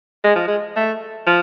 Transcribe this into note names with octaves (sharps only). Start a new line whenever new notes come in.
G#3
F3
G#3
A3
F3